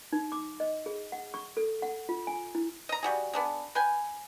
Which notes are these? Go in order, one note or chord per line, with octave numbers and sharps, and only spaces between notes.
D#4
D6
D#5
G#4
F#5
C#6
A4
F#5
F4
G#5
E4
D#5 A#5
G3 F#4 G#4
B3 D4 G#4
B4 G5 G#5